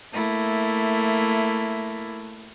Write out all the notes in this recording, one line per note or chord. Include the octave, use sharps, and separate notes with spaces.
A3 A#3 E4